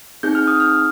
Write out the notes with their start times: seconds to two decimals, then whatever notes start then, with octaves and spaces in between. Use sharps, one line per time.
0.23 C4 D#4 G#4 G6
0.35 F6
0.47 D#6
0.60 F6